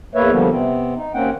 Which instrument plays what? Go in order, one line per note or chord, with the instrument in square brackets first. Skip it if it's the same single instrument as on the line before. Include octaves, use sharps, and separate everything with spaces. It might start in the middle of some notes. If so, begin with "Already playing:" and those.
[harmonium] E2 A#3 B4 C#5 E5
D3 F3 G3 A#3 B3
C3 B3 C4
D#4
D#2 A#3 C4 C#4 F#5 G5